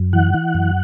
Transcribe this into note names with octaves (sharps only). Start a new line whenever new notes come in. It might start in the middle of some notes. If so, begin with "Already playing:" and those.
Already playing: F#2
E3 F#5
E3
F#2